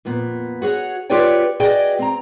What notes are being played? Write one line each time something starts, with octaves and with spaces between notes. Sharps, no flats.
F2 A#2 B3
F#4 G#4 C#5 F#5
F4 G4 B4 C#5 D5 G5
F#4 G#4 B4 D5 D#5 G5
C4 A#5